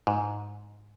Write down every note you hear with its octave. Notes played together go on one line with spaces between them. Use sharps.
G#2